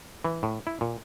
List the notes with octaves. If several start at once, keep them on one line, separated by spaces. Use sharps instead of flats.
E3
A2
E4
A#2